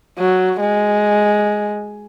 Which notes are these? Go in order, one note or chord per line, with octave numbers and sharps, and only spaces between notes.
F#3
G#3